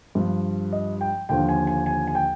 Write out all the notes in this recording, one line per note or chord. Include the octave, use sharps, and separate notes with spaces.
G2 F3
D#5
G5
D#2 D3 F3 G5
G#5
G#5
G#5
G#5
G5